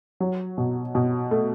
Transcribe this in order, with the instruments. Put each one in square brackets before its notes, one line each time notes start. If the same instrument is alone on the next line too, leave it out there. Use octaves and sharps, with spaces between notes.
[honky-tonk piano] F#3
B2
B2
A3